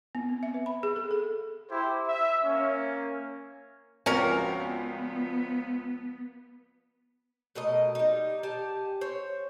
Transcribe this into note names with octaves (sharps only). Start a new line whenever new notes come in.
B3
C4
E5
B4
B5
G#4
A4
A4
E4 G4 C5
E5
A#3 C#4
C#2 F3 C4 C#4 F#4 A#4 D5
B3
B2 A3 A#4 D#5
G3 D#4
G4 G#5 A5
C5 C#5